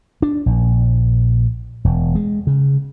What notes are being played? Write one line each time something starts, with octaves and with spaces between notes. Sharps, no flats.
D4
A#1
E1
G#3
C#3